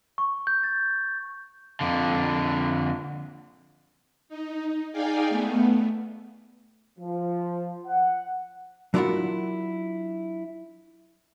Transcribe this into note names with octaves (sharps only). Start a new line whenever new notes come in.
C#6
G6
A6
F2 D3
D#4
D#4 G#4 D5 F5 G5 G#5
A3 B3
F3
F#5
F#3 D4 E4 F4 A#4 F#5